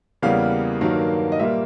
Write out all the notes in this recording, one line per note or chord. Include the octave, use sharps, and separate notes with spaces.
E2 C#3 E3 G3 A#3 F5
G2 D#3 F#3 A#3
D#5
A#2 G3 A#3 E5